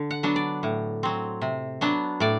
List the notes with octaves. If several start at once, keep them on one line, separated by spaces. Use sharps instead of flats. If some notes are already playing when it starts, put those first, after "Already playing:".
Already playing: D3
F#5
F#3 B3 D4
D5
A2
F#3 C4
C3
F#3 B3 D4
A2 D5